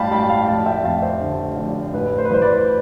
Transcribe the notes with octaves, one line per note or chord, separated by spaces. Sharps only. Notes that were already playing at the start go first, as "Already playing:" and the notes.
Already playing: A1 G2 D5 F5 G5 A5 B5
A1 G5 B5
F5 A5
F1 F5 A5
E5 G5
F2 F5 A5
C5 E5
D3
F1
A1 B4
C5
B4
E3 C5
B4 D5